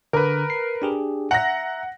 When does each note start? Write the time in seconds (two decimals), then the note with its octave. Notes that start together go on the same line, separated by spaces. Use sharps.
0.13 D3 A#4 B4
0.50 C7
0.82 D4 G4 G#4
1.31 E5 F#5 A#5 A#6